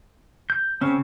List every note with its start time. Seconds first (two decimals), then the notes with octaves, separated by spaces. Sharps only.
0.50 G6
0.81 C#3 C4 C#4